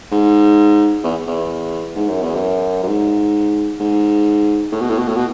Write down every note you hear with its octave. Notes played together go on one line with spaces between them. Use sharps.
G#2
E2
E2
G#2
F#2
E2
F#2
F#2
G#2
G#2
A2
B2
A2
B2
A2
B2